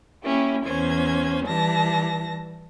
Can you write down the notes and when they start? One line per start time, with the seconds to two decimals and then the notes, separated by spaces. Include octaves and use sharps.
0.24 A#3 C#4 E4 G4
0.65 E2 C#4 C5 G#6
1.46 E3 G3 A5 A#6